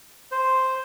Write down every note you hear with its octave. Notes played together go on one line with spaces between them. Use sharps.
C5